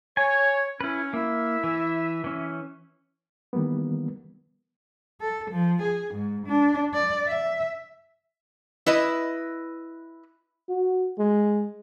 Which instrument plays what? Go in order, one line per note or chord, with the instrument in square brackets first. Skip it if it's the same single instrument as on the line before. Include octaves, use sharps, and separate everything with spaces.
[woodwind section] C#5 [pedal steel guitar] G#5
[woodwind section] C#4 [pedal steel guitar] E4 B4
[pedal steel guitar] A#3 [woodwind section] E4 E5
[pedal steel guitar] E3
E3 C#4
[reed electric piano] D#3 E3 G3 A#3 B3
[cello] A4
F3
G#4
G#2
D4
D5
E5
[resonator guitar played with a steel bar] E4 B4 D#5
[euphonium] F#4
G#3